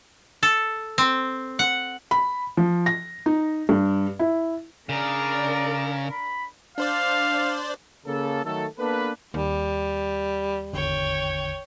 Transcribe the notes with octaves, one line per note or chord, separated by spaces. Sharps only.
A4
C4
F#5
B5
F3
A#6
D#4
G2
E4
C#3 D4 A#4 D5
B5
D4 C5 D5 F5
C#3 A#3 A4
D#3 F#3 A3 A4
A#3 B3 D4 A4 B4
D#2 G3
G#1 E2 D3 C#5 G5